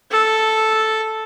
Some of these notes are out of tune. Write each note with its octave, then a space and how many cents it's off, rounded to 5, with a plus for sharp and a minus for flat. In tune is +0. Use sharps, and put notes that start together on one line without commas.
A4 -5